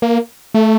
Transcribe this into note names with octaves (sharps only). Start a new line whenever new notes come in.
A#3
A3